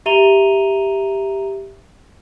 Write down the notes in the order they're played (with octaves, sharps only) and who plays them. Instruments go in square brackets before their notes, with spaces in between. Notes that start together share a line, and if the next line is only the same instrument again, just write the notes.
[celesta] G4 E5 A#5 D#7 F7 G7